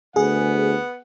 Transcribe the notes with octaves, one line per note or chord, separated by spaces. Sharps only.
D2 B3 G#4 F#5